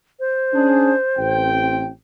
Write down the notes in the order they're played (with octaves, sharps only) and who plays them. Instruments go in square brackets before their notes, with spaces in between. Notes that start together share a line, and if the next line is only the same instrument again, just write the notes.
[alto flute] C5
[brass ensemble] C#4 D4 G#4
A1 C4 G5